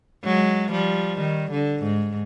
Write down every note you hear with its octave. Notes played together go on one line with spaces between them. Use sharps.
F#3 G#3
F3 G3
D#3
D3
G#2